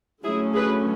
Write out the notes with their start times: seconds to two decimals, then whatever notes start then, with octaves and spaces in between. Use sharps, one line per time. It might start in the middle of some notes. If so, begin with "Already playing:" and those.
0.23 D3 F#3 A3 C#4 E4 G#4
0.54 G#4 B4